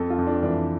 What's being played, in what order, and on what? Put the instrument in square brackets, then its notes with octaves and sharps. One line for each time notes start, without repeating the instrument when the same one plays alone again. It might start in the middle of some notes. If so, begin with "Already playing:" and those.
Already playing: [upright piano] F2 A4
F4
F2
D4
E3 D4